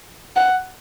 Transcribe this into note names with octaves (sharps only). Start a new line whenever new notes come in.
F#5